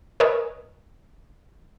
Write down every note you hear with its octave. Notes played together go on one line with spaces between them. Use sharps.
A#4 B4 C#5 D#5 G#5 D#6